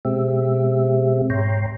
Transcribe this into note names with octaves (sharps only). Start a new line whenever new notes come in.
B2 G#3 C4 G4 E5
G#2 C#5 G5 A#5 C6